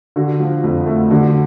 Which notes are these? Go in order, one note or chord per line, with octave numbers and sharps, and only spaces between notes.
D3 F#4
F3
F2
A3
D3 F#4